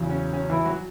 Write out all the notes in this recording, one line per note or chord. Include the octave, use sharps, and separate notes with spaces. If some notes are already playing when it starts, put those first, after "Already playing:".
Already playing: E2 C#3 F#3
C#4
C#4
E3 E4
F#3 F#4